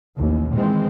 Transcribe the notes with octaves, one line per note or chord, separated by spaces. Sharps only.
A1 D#2 A2
D#3 E3 G#3 C4